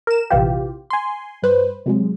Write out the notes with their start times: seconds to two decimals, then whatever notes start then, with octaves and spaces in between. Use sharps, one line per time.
0.07 A#4 E7
0.30 A#1 C3 E3 F4 G4
0.90 G#5 C6
1.42 G2 B4 C5
1.86 C3 F#3 G#3